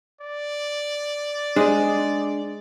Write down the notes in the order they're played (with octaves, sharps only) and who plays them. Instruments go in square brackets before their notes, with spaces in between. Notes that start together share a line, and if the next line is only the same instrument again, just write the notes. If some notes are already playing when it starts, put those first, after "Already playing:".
[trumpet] D5
[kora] G#3 [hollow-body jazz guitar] D4 C5 D#5